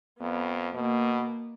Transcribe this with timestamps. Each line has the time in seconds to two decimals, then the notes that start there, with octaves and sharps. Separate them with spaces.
0.20 F2 B3
0.74 B2 A#3